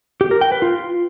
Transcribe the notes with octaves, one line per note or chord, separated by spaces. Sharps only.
G4
A#4
G5
B4
F4